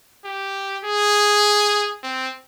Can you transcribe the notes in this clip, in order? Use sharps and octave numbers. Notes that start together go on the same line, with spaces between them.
G4
G#4
C4